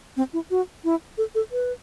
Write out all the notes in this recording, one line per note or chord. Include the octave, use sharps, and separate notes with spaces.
C4
E4
F#4
E4
A4
A4
B4